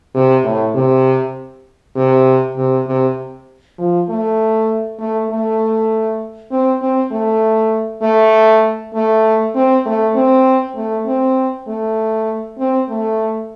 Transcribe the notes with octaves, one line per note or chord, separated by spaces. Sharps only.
C3
A2
C3
C3
C3
C3
F3
A3
A3
A3
C4
C4
A3
A3
A3
C4
A3
C4
A3
C4
A3
C4
A3